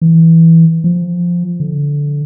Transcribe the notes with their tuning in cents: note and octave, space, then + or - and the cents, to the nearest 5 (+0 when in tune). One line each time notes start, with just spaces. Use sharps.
E3 -5
F3 +0
D3 -15